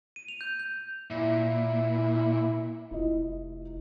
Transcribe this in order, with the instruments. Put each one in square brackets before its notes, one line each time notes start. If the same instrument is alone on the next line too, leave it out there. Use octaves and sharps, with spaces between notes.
[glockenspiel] D#7
F7
G6
G6
[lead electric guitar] A#2 [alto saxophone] E4
[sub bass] F1 [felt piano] E4 F4 D#5